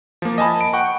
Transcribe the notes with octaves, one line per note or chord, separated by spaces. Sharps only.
F3 A#3
D#5 G#5 A5 B5
D7
F#5 G5 C#6